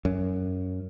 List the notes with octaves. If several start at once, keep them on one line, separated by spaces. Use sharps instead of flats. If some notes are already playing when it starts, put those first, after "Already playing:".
F#2